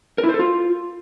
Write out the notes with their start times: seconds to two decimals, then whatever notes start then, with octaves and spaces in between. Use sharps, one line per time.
0.18 A#4
0.24 E4
0.29 C5
0.34 A4
0.39 F4